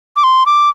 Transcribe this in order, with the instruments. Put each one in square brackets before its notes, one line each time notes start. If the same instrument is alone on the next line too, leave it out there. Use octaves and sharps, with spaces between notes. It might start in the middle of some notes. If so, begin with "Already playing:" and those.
[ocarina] D6
C6
D6